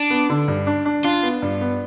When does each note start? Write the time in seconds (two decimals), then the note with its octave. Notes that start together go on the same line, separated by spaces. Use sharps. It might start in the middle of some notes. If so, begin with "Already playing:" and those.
Already playing: D4
0.10 B3
0.30 D3
0.48 G2
0.67 D4
0.86 D4
1.04 D4 F4
1.23 B3
1.42 G2
1.61 B3